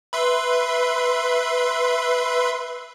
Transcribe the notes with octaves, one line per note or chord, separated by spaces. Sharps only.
B4 E5 C6